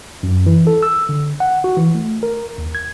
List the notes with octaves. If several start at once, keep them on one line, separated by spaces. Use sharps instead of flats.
F#2
E3
A4
E6
D3
F#5
F#4
E3
A3
A#4
D#2
G#6